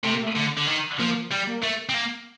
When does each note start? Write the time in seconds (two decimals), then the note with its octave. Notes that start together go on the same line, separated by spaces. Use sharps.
0.04 C3 A3
0.13 A#3
0.22 A3
0.36 D3
0.58 D3
0.67 D#3
0.99 F3 A#3
1.31 G3
1.47 A#3
1.63 A3
1.89 C4
1.94 A#3